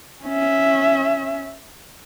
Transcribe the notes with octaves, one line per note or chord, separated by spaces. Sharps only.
C#4 E5